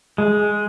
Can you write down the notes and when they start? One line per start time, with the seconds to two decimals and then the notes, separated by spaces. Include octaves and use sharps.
0.18 G#3